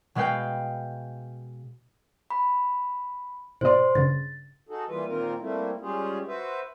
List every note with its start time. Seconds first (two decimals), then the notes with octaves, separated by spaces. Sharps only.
0.15 B2 G#3 B4 F5 G5 G6
2.30 B5
3.61 G#2 B2 C5 D5 C6
3.95 G2 C#3 A6
4.69 D#4 F#4 G#4 A4
4.88 E3 G3 A#3 F4 B4
5.07 A#2 D#3 A#3 C4 F4 A#4
5.40 G3 A3 A#3 C4 E4
5.81 G3 G#3 C#4 F4 G4 G#4
6.27 F#4 B4 C5 E5